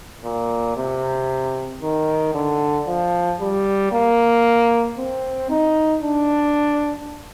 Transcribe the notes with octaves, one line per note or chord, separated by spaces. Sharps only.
A#2
C3
D#3
D3
F3
G3
A#3
C4
D#4
D4